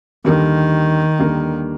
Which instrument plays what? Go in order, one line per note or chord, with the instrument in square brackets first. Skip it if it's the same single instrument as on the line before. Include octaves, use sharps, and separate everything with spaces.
[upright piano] D#2 D3 G3 A#3 [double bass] D#3
[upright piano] D#2 D3 G3 A#3